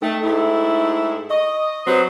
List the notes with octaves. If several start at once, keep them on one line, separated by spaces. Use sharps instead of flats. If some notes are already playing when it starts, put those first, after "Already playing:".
A3 D#4 A4 G5
G#2 A3 E4
D#5 C#6
F#3 C4 G4 B4 C5 D#6